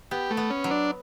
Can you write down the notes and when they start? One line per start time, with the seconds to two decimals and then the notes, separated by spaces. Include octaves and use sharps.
0.11 B3 G4
0.30 A3
0.37 B3
0.50 C#4
0.64 F#3
0.71 D4